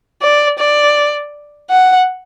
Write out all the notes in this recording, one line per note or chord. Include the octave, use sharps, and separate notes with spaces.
D5
D5
F#5